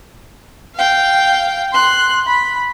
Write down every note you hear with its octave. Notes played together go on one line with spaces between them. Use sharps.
F5 G5
C6 F#6
B5